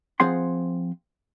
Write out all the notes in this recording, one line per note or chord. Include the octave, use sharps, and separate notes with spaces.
F3 C4 G#4 F#5 C6